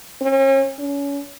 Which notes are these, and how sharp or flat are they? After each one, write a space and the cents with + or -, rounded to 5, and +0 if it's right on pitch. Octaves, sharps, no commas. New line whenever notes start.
C#4 -40
C#4 +30